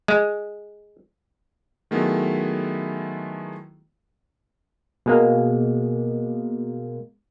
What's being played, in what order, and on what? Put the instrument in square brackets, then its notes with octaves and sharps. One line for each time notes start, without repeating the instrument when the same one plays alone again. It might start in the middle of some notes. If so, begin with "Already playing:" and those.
[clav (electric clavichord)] G#3
[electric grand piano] D#3 F#3 G#3 A3 B3 E4
[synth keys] B2 G#3 A#3